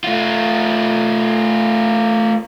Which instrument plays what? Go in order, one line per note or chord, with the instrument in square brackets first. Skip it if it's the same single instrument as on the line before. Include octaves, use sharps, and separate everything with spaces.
[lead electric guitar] A3 F4